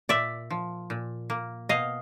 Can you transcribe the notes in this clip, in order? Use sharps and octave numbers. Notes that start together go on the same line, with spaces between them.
A#2 D5 E5
F3
A#2
A#3
B2 D#5 F5